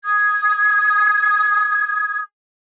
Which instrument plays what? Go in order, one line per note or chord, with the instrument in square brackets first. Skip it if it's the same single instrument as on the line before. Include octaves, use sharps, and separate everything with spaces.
[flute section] D#6 G#6